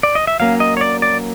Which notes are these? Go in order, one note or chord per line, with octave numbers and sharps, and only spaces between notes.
D5
D#5
E5
F#3 A#3 C#4 F5
D#5
C#5
D5
D5